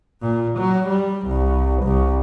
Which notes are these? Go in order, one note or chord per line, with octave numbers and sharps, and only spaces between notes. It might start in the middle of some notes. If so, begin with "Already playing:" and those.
A#2
F#3
G3
C2
C2